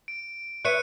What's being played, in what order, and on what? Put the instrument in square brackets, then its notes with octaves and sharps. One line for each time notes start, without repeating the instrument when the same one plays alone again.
[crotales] D7
[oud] B4 C#5 E5 [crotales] F#6 C#7 D#7